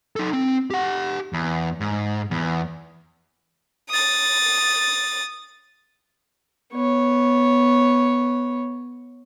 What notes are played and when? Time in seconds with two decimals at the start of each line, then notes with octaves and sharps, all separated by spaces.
0.16 D#4 A4
0.33 C4
0.70 G4 F#5
1.33 E2
1.80 G#2
2.31 E2
3.90 D#6 A6
6.73 B3 C#5